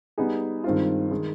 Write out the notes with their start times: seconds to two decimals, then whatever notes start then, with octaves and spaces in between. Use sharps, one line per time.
0.18 G3 B3 D#4 G#4
0.64 G2 D#3 G#3 C4 F4
1.11 D#3 G#3